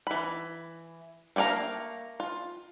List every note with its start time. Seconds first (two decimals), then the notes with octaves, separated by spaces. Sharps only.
0.07 E3 B5
1.36 A3 A#3 D5 F5 A#5
2.20 F4